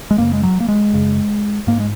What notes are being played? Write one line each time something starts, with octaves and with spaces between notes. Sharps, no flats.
G#3
F#2 C#3 A#3
G#3
F#3
A#3
G#3
F#2 C#3
G#2 A#3
G#3